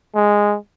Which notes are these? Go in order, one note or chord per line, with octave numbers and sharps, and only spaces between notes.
G#3